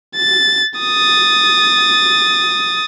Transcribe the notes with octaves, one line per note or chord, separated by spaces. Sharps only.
A6
D#6 A6